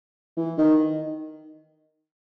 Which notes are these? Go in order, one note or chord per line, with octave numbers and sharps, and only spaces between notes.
E3
D#3